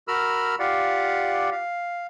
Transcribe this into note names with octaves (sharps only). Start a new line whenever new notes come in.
F#4 A#4 B5 E6 F6
F4 G4 D5 F5 F#5
F5